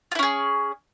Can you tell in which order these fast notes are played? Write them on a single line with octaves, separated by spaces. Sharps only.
F4 E4 C#4 G#4